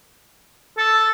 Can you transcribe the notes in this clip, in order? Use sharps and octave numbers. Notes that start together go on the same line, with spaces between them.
A4